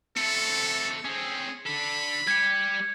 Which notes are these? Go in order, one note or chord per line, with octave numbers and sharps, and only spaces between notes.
A3 C4 A4 C#7
C4 C#4 G#4
D4 A4 B5
G3 G4 G#6 C#7